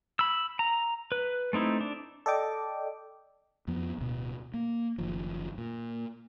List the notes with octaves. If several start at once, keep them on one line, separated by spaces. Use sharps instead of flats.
B5 E6
A#5
B4
A3 C4 D#4 E4
D4
A4 D5 D#5 G5 D6
F2 F3 B3
D1 B2
A#3
F#1 D#3 F3
A#2